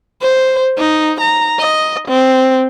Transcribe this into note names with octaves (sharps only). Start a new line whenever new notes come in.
C5
D#4
A#5
D#5
C4